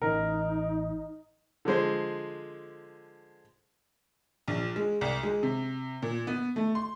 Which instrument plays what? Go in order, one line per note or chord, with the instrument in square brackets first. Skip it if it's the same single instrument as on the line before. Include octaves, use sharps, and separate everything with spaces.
[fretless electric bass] A1 E3 C#4 [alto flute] D#4 [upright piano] A#4
[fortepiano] D3 F3 G#3 C5
[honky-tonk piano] A#1
G#3
C2
G#3
C3
A#2
B3
A3
C6